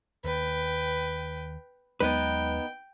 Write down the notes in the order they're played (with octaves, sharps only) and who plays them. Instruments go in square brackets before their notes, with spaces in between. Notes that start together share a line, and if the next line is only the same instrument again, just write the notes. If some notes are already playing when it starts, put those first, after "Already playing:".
[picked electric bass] D#2 [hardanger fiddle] B4 G5
[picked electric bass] D#2 F#3 G#3 [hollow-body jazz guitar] B3 D#4 B4 [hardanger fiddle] G5